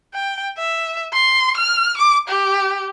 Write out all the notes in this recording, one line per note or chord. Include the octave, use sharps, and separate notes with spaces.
G5
E5
C6
F6
D6
G4